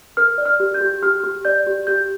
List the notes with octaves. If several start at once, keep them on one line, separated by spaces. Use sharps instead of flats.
A#4 F6
D5
F6
G4
G6
G4
G4 F6
G4
D5 G6
G4
G4 G6